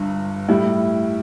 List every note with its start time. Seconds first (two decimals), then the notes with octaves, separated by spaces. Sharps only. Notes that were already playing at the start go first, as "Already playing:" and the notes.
Already playing: G1 G2
0.48 A2 G3 E4